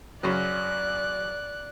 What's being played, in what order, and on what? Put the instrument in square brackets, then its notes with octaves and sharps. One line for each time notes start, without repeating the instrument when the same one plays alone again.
[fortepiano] F#2 C#3 F#3 [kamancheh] D5 F#6